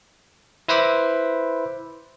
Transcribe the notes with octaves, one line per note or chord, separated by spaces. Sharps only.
E4 B4 C5 E5 B5 D6